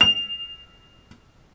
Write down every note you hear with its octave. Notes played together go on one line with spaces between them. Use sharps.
F7